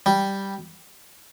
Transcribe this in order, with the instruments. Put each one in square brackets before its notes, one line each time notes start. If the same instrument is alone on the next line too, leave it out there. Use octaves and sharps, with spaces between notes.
[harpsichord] G3